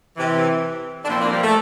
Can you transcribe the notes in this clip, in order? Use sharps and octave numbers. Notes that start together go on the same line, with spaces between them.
C3 E3
D4
A#2 F3 C4 E4
A#3 D4
G3 A#3
A3